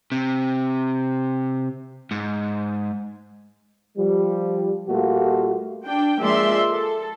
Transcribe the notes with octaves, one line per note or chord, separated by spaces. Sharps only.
C3
G#2
F3 G3
A#2 G3 A3 A#3 F4 F#4
D4 G5
F3 G#3 A#3 D5 E5 C6
A4